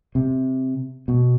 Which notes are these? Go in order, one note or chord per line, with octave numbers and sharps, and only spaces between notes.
C3
B2